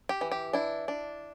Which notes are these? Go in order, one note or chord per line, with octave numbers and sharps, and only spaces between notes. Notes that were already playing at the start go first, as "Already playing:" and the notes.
G4
E3
G4
D4 E4
D4